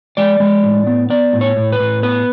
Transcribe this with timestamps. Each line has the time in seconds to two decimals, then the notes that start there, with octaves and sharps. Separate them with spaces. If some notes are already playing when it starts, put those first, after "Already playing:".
0.17 G#3 D5
0.40 G#3
0.63 A2
0.87 B3
1.10 B3 D5
1.33 A2
1.41 C#5
1.57 A2
1.73 B4
1.80 A2
2.03 B3 B4